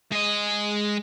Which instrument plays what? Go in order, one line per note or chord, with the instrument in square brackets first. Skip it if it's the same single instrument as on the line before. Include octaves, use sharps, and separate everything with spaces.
[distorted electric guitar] G#3 D#5